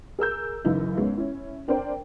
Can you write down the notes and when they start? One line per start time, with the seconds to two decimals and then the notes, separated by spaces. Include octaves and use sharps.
0.19 G#4 A#4 E6 G6
0.64 F#2 C#3 E3 D#4 E4
0.96 G#2 G#3 B3 C#4
1.17 C#4 E4
1.68 C4 D4 A#4 C5 G5